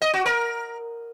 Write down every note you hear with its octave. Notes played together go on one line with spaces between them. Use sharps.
D#5
F#4
A#4